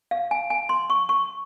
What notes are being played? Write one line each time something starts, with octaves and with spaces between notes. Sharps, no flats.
F5
G#5
G#5
C6
C#6
C#6